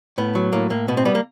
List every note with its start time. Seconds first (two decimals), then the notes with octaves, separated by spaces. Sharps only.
0.18 A2 B3
0.35 F#3
0.53 A2 A#3
0.70 A2 A#3
0.88 B2 B3
0.97 C4
1.05 G3 B3
1.15 A#3